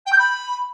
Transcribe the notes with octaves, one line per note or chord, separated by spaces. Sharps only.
G5
G6
B5